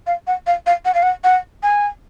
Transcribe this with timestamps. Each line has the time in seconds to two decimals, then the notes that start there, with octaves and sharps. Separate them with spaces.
0.07 F5
0.27 F#5
0.47 F5
0.66 F5
0.85 F#5
0.94 F5
1.03 F#5
1.24 F#5
1.63 G#5